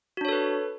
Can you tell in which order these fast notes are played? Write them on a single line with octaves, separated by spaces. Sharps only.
F#4 D4 C#5 A4 B4